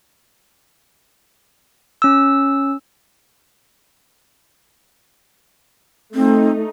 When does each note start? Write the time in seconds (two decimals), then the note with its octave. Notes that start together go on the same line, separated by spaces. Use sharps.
2.02 C#4 E6
6.15 A3 C4 D#4